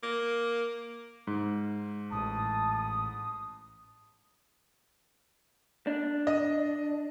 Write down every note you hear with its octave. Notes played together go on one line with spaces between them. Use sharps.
A#3
G#2
A1 A5 D#6
D4
D#5